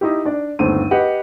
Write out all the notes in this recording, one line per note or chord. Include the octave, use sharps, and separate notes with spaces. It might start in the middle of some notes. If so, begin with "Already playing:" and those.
D#4 E4 G4
D4 D5
G1 D#2 A3 C4 D#7
G4 B4 D#5 F#5